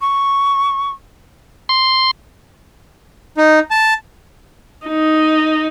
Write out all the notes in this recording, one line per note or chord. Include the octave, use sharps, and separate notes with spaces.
C#6
C6
D#4
A5
D#4